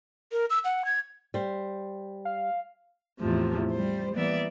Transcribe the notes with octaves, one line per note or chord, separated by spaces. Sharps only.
A#4
E6
F#5
G#6
G3 C5
F5
E2 A2 C3 F3
G3 C5
E3 G3 A#3 B3 D5 E5